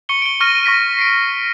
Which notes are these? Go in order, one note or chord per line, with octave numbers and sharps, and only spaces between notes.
C#6 C#7 G7
D7 G7
C#6 F6 A#6 D#7
C#6 A#6 B6
C7 D7